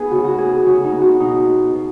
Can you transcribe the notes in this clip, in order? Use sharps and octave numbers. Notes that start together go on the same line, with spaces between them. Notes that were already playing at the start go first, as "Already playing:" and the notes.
Already playing: B3 D#4 G#4 B4
C#3 F#4
F#4
B3 G#4
G#4
C#3 F#4
D#4
B3
F#4
B2 D#4
B3
B2